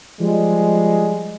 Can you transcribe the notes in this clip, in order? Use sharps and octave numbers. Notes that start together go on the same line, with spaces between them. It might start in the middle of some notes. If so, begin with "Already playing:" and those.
F3 G3 G#3